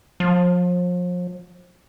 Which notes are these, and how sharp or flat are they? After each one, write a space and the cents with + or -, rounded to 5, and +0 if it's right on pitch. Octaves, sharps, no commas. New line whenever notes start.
F3 +35